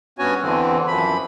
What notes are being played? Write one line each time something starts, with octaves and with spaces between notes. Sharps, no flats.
G2 B3 C#4 F#4 C#5 G#5
E2 D3 E3 C4
F#2 F3 B5